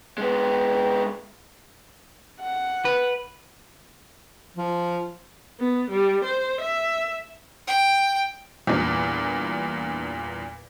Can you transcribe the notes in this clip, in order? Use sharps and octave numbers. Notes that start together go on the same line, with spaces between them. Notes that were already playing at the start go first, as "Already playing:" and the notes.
G#3 B3
F#5
B4
F3
B3
G3
C5
E5
G5
E2 G2 A#2